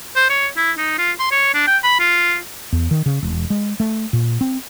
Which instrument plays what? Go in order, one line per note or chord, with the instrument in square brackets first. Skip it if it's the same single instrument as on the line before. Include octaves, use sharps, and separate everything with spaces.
[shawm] C5
C#5
E4
D#4
F4
C6
C#5
D4
G5
B5
F4
[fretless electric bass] E2
D#3
C#3
E1
G#3
A3
A#2
C4